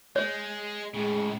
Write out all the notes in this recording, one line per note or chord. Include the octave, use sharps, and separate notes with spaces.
G#3 C#5
A2 C#3 G#3